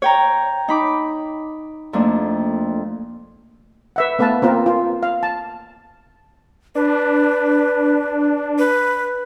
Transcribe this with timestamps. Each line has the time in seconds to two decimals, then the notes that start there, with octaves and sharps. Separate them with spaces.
0.02 C#5 G5 A#5
0.68 D#4 B5 D6
1.93 F2 A3 A#3 D4
3.96 B4 E5 F#5
4.19 A3 B3 B4 F5 A5
4.42 A#3 C4 F4 A#4
4.66 F4
5.03 F5
5.23 A5
6.75 D4 B4
8.58 B4